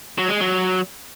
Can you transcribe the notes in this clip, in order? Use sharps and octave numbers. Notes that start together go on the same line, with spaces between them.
F#3
G#3
F#3